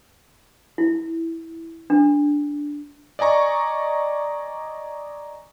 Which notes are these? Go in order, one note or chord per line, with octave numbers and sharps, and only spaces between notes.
E4
D4
D5 D#5 G#5 A#5 C#6